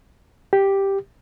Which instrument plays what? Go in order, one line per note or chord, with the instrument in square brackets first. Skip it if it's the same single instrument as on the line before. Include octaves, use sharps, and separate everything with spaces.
[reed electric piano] G4